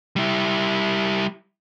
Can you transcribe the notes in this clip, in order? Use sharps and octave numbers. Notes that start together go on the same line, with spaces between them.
G3 E4